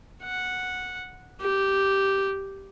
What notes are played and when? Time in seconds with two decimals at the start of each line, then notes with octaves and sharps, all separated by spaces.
0.23 F#5
1.41 G4